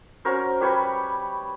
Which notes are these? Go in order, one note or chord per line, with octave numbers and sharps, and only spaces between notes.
C#4 F#4 A#4 C5
G3 B4 C#5 G5